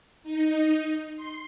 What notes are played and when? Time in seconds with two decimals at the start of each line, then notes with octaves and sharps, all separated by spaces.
0.23 D#4
1.16 C6